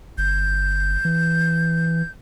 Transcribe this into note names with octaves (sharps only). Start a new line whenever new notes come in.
G1 G6
E3